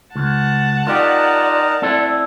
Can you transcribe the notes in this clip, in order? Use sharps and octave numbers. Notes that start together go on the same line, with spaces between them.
C#2 F#5 A5
D#4 F4 G4 A#4 D5
C4 E4 A4